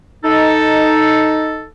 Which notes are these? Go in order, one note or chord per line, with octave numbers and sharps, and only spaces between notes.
D#4 A4